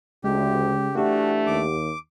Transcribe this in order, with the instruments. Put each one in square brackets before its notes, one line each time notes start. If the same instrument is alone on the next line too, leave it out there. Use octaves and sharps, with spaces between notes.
[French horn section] D2 [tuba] C#3 [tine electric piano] G#3 [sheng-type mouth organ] G4
[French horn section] E3 A3 D4 [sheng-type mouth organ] F#4 [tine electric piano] G4 F#5
[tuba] D#2 [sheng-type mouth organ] D6